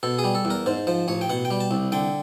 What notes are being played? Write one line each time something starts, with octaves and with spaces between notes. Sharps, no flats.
B2 A4
G#4
G3
A4
E2
A#4
G#2 C5
F3 C5
A1 C#5
G5
B2 F#5
G5
G3
A5
C2
D3 G5